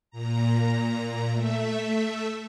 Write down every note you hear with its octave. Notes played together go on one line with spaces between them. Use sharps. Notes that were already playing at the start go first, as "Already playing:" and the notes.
A#2 A#5
A3 E5